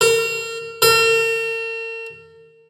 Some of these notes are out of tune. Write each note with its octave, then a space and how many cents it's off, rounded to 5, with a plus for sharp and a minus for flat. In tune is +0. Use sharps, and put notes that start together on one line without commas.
A#4 -35
A#4 -45